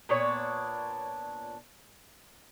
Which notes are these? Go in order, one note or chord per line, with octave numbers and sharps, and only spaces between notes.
A#2 B3 D4 C#5